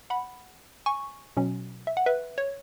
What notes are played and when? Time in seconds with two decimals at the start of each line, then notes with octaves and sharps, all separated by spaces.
0.10 F#5 B5
0.86 G#5 C#6
1.37 B2 F#3 C#4
1.87 E5
1.97 F#5
2.06 B4 E5
2.38 C#5